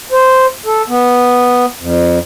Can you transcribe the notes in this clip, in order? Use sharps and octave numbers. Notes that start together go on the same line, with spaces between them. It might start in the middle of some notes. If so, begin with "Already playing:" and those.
C5
A4
B3
F2